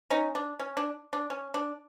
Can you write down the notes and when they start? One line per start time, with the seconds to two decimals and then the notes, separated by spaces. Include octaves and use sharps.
0.10 C#4 D#4
0.35 D4
0.59 C#4
0.77 D4
1.13 D4
1.30 C#4
1.54 D4